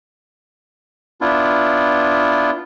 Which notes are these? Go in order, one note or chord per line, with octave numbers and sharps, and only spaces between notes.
B3 D4 E4 F4